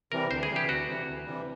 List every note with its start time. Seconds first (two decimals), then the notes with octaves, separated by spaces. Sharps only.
0.12 C3 E3 G3 A#4
0.31 D2 C5
0.43 G#4
0.50 C3 E3 G3
0.56 G4
0.69 D2 F#4
0.87 C3 E3 G3
1.07 D2
1.26 C3 E3 G3